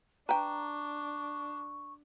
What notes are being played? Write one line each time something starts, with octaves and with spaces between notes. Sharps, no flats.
D4 B4 G5 A#5 C#6